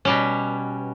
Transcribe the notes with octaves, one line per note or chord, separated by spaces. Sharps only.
B2 G3 C#4